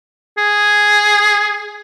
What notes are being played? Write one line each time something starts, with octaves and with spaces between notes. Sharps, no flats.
G#4